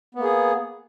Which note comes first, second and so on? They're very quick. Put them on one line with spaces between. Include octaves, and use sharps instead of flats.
B3 A#3 G#4